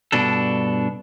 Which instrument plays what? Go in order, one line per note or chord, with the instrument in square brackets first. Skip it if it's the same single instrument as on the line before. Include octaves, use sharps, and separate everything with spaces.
[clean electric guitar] G2 B2 D4 A4